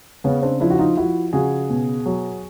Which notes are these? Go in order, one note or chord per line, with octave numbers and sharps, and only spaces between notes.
C#3 B3 C#4
C4 D4
F3 D4 E4
F#4
D#4 F4
F3 E4 F#4
C#3 F#4 G#4
B2
F#3